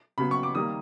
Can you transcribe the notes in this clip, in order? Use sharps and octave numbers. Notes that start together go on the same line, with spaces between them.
C#3 F#3 B3 B5
C#6
D6
D#3 G3 A#3 D#6